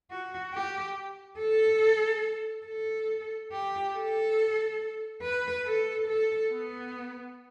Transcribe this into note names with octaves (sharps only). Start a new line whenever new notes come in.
F#4
G4
A4
A4
G4
A4
B4
A4
A4
B3